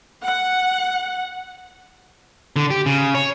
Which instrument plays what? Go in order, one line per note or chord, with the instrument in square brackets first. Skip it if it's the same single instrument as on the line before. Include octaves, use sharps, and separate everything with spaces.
[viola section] F#5
[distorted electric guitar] D3
G4
C#3
C#5